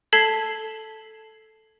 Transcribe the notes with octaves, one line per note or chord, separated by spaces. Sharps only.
A4 A5 G#6 B6 C7 G7